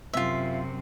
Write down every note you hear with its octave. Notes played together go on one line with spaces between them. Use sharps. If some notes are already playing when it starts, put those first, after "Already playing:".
F#2 C3 F4 E5